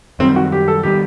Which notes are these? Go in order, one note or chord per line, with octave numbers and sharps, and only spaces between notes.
F#2 D#3 G3 C4
F#4
G4
A4
D#3 G3 B3 G4